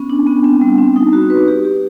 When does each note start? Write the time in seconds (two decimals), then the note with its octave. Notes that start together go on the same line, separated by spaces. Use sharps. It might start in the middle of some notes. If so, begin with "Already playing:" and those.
Already playing: B3 C#4
0.10 D4
0.27 B3
0.44 C4
0.61 G3
0.78 C4
0.96 D#4
1.13 F#4
1.30 B4
1.48 G4
1.65 G4